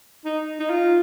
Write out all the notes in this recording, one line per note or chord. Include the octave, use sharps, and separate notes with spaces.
D#4
D#4
F4